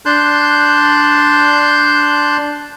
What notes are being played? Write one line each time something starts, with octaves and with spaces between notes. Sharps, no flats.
D4 A5 C6 F#6 G6